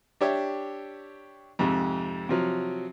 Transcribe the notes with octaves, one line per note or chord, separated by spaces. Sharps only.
D4 G4 C#5 E5
F2 G#2 C3
C3 F3 F#3